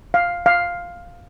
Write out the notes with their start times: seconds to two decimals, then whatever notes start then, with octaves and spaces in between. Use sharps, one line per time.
0.14 F5
0.46 F5